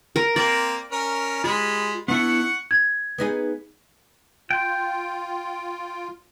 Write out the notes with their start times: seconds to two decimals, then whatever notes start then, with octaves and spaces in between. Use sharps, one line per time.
0.16 A#4
0.36 A#3 C4 D5
0.92 C#4 A#4
1.44 G#3 F4 G4 B5
2.08 B3 D4 E4 F#5 C#6
2.71 G#6
3.18 B3 D#4 G#4
4.51 F4 G5